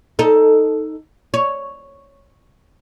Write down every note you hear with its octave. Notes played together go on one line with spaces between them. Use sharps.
D#4 A4
C#5